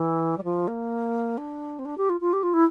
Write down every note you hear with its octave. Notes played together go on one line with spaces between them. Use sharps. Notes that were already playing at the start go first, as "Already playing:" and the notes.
Already playing: E3
G3
F3
A#3
D4
C4
D4
G4
F4
F4
G4
F4
E4